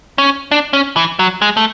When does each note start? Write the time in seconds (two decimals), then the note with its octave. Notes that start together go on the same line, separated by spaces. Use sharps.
0.18 C#4
0.51 D4
0.73 C#4
0.96 E3
1.19 F#3
1.42 G#3
1.57 A3